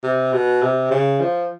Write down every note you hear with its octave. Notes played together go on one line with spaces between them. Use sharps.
C3
B2
C3
C#3
F3